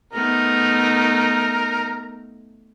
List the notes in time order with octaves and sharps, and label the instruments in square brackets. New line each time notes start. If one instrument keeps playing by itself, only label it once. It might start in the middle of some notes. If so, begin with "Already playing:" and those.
[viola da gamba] A3 B3 D#4 [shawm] A#4